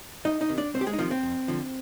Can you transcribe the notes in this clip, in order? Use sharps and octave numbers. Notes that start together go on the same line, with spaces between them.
C2 D#4 D#5
D#4 D#5
C3 D#3
D4 D5
C2 C4 C5
G4
G#3 G#4
D#4
C3 D#3 F3 F4
C4
F2
D3 F3